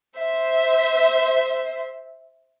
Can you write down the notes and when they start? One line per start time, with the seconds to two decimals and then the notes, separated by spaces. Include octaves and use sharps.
0.18 C5 E5